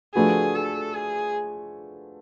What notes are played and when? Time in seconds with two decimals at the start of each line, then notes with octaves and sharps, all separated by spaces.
0.14 F3 A3 D4 F#4 G#4 B4
0.55 A4
0.95 G#4